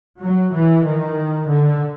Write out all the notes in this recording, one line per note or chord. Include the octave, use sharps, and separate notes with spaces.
F#3
E3
D#3
D3